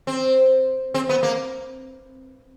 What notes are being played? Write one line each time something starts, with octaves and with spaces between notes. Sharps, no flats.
C4
C4
B3
A#3